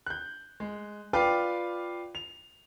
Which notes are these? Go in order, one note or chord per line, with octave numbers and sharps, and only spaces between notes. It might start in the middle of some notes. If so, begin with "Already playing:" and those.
F#6 G6
G#3
F4 B4 D5 F5 G5 D6
F7